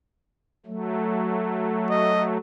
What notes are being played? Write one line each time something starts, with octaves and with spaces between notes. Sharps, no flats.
F#3 A3
D#5